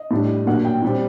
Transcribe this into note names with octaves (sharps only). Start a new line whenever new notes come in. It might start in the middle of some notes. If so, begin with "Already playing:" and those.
Already playing: D#5
A2 G3 D4
A#2 F#3 A#3 D4 F#5
G5
A#2 G3 C4